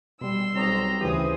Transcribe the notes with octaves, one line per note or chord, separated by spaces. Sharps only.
B2 G3 C6 E6
B1 G3 C4 C#5 A#5 D#6
D2 C#3 E3 G4 G#4 B4 C5 D#6